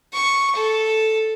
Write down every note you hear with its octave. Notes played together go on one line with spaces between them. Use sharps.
C#6
A4